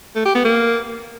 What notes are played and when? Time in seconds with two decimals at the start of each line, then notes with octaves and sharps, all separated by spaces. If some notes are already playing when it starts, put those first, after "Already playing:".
0.15 A3
0.25 G4
0.35 B3
0.45 A#3